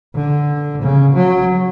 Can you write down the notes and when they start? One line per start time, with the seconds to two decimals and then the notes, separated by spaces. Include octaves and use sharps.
0.15 D3
0.82 C#3
1.15 F#3